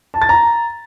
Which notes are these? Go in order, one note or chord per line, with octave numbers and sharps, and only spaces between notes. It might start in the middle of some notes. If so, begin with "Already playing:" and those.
A5
A6
A#5